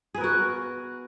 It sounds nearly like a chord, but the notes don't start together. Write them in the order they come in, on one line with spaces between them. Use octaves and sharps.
G#4 B3 A#4 F#4